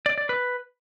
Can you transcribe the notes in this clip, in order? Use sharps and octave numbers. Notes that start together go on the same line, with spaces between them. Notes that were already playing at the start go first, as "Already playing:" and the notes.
D5
D5
B4